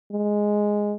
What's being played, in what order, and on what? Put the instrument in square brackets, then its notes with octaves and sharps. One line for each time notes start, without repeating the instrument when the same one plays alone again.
[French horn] G#3